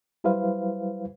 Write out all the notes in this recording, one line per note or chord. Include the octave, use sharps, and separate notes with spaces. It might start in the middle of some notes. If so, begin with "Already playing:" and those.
F#3 G3 E4 B4 C5 F5